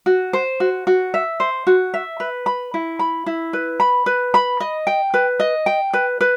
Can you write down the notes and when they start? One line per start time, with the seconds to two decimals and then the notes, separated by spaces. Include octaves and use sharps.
0.06 F#4
0.33 C5
0.60 F#4
0.87 F#4
1.14 E5
1.40 C5
1.67 F#4
1.94 E5
2.20 B4
2.46 B5
2.74 E4
2.99 B5
3.26 E4
3.53 B4
3.80 B5
4.06 B4
4.34 B5
4.60 D#5
4.87 G5
5.14 B4
5.40 D#5
5.66 G5
5.93 B4
6.21 B4